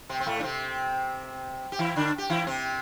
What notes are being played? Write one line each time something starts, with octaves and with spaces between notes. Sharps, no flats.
C3 C4
C4
A2 A3
D4
C3 C4
G4
E3 E4
D3 D4
G4
E3 E4
C3 C4